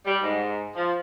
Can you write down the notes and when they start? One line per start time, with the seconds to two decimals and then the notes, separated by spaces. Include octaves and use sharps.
0.05 G3
0.23 G#2
0.76 F3